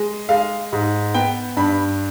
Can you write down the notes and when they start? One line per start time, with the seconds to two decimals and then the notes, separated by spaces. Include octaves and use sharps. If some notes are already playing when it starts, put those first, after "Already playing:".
Already playing: G#3
0.29 G#3 F5
0.73 G#2
1.14 B3 G5
1.57 G2 B5